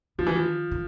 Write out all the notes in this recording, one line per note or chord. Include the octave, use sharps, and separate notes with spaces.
D#3 F3
E3
F3
D#3